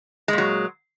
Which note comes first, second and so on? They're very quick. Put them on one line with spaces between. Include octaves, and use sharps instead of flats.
G#3 A#2 F#3